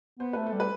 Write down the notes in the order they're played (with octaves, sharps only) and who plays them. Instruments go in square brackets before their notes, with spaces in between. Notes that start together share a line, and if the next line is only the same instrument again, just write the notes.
[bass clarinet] B3 [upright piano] C5
[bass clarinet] A3 [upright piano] B4
[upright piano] A4
[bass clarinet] G3
[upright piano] B4